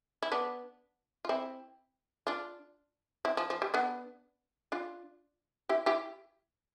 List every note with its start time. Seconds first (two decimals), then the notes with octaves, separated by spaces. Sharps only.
0.23 E4
0.32 B3 D4
1.25 F4
1.29 C4 E4
2.27 D4 F4
3.25 C4 E4
3.37 F3
3.50 F3
3.62 G3
3.74 B3 D4
4.72 D4 F4
5.69 E4 G4
5.86 E4 G4